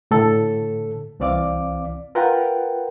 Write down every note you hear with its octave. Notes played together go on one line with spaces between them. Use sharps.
A2 D3 A4
C2 E3 C4 D5 F5 D6
F4 A#4 B4 F#5 G5